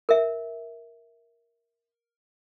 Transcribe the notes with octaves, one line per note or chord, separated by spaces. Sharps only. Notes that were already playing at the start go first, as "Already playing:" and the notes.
A#4 E5